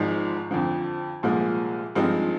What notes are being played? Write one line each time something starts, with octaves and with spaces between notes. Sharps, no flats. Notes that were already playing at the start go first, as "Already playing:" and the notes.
Already playing: G#1 G#2 F3 G#3 D#4
F2 D3 F3
C2 A#2 F3 G#3
G2 F3 G#3 C4 D#4